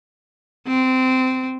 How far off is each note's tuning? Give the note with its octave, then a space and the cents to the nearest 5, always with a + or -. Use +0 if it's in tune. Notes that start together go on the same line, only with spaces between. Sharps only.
C4 -20